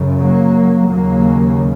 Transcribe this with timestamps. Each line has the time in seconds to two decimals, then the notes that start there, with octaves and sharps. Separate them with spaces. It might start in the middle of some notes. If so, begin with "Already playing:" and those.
Already playing: F#2 C#3
0.18 F#3 A#3
0.89 D#2 C#3 F#3 A#3